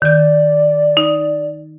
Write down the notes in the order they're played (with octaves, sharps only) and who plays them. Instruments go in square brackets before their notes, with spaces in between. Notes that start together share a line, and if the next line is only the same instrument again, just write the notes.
[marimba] D#3 G6 [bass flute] D5
[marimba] D#4